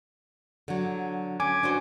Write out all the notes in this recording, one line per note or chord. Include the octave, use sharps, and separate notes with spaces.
D3 F#3
C#4 G#5 D6
D4 F#4 C5